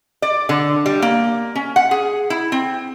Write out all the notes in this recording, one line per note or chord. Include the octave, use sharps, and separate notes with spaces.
D5
D3
G3
A#3
C#4
F#5
G#4
E4
C4